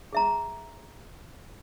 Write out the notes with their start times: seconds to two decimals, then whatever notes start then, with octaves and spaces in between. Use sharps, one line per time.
0.13 G#4 E5 A#5